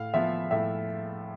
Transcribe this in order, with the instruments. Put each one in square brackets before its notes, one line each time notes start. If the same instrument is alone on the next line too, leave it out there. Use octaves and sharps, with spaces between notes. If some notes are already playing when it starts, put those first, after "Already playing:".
Already playing: [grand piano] A2 F5
F3 B3 E5
A2 E5